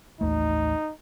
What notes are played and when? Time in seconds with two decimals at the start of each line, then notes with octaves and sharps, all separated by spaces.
0.21 A1 D#2 A3 D#4